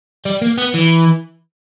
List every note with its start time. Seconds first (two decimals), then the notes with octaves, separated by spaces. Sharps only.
0.25 G3
0.42 A#3
0.58 B3
0.75 E3